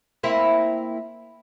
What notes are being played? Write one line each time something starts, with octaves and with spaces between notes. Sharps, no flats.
A#3 C4 E4